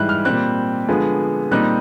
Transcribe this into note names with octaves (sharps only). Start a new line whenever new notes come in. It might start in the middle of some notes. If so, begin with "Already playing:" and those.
Already playing: G#2 E3 G3 F#6
F6
A#2 G3 C4 F#6
D3 F3 G#3 B3
A#2 G3 C4 D#4 F#6